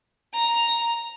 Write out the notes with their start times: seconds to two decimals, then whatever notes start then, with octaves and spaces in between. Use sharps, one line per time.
0.34 A#5